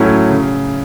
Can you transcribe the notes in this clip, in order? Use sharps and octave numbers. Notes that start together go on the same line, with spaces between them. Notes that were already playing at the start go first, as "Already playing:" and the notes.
Already playing: A2 F#3 A3 C#4 E4
C#3